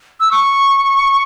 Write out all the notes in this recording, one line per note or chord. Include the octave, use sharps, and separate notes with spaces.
E6
C#6